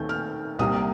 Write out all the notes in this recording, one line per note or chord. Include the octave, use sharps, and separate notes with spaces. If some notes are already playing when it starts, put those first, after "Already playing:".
Already playing: D#2 D#3 A3 C4 G6
F6
C2 C3 G3 A#3 D#6